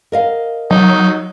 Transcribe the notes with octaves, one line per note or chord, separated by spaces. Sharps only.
A#4 D#5 F5
F#3 D#4